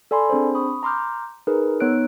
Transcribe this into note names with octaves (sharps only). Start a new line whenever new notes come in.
A4 D5 G#5 B5 C6
C4 D4 G#4 C5
B5 C#6 D#6
A#5 C6 D6 F6 G6
D#4 G#4 A#4 B4
B3 D#4 C#5 E6 F#6 D7